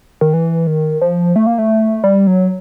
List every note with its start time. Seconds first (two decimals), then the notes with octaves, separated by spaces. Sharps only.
0.21 D#3
0.34 E3
0.67 D#3
1.02 F3
1.36 A3
1.46 A#3
1.58 A3
2.04 G3
2.27 F#3